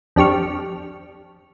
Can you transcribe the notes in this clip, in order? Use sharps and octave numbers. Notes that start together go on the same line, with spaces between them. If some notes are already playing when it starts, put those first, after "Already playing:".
F2 D4 G4 C#6 F6